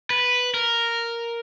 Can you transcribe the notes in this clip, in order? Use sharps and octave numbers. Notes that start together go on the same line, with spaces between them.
B4
A#4